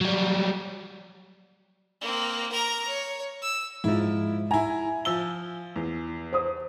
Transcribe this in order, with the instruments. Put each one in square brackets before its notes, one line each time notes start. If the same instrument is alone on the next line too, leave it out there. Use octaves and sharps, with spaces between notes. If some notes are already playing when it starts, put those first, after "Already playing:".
[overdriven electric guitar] F#3 G3
[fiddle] A#3 C4
A#4 A#5
C#5
E6
[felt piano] G#2 [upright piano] F3 E4
[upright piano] E4 A#5 [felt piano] G#5
[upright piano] F3 E6 G7
E2
[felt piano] C5 D#6